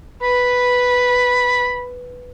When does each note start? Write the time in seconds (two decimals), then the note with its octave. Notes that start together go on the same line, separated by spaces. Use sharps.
0.22 B4 B5